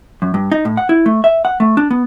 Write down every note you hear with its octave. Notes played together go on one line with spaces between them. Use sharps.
F#2
G2
D#4
A2
F#5
E4
A3
E5
F#5
A3
D4
B3